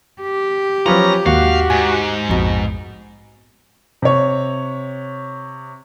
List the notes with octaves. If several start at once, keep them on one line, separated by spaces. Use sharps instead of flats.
G4
F3 F#3 B3 C#4 F4 A#5
D#2 G#2 D#3 F#4 F5
G#2 G#5
A#1 F2 B2 A#5
C3 C#5